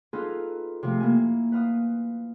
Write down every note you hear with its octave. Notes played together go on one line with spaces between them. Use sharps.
D#4 F4 G#4 A4 B4
C3 F3 A3
A#3 E4 G#5
B4 F5 D#6